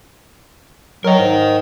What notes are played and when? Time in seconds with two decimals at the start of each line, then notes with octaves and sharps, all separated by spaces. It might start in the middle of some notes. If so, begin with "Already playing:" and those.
1.04 F#3 A#4 D#5
1.19 G#2